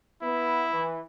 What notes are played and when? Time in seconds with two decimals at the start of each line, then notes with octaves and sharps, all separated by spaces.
0.22 B3 E4
0.70 E3